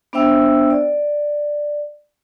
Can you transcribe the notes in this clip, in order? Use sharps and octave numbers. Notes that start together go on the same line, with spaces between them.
B3 D4 C5 E5 G5 E6
D5